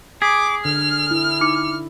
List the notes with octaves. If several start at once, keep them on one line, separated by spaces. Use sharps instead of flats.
G#4 D6 B6
D3 F6
E4
D#4 D6 C#7